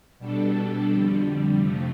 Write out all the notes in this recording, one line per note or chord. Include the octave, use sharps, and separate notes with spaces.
B2 G3 D4 A4
F2 D3 G3
F2 C3 F3 A3